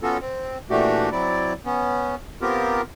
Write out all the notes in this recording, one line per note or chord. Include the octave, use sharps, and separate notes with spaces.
B3 C#4 F4 F#4 A4
C4
A#2 E3 A3 D4 F#4 G4
F#3 C4 E4 D5
B3 C#4
B3 C4 F4 G4 A#4